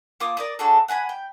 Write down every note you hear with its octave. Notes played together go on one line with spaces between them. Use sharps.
A#3 F4 D6 D#6
A#4 D5 D#6
D4 F#4 G#4 A4
F#5 G#5 A#5 B5
G5